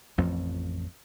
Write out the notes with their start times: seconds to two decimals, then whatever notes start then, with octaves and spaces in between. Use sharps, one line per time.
0.18 A1 F2 F3 C4